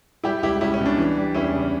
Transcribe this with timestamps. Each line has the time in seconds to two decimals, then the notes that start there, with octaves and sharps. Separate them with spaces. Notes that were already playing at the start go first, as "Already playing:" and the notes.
0.24 G3 E4 G4
0.43 C#2 E4 G4
0.61 C#2 C#4 E4
0.74 C#4
0.80 B2
0.86 D4
0.98 E3
1.17 G3
1.34 E2 C#4 E4
1.54 C#3